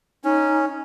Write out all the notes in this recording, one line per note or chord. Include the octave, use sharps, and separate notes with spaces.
C#4 D#4